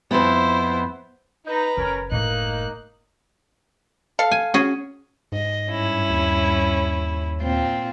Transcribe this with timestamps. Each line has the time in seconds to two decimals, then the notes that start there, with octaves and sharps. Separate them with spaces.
0.11 F2 B3 E4 C5
1.46 D#4 B4 A#5
1.77 F#1 C#3 C#4 A#4
2.12 A2 A#3 D#4 F#6
4.19 A4 F5
4.32 G#5
4.54 C#4 F#4 G#4
5.32 G#2 D#5
5.67 G2 C#4 E4
6.10 D#2
7.40 A#2 C4 F4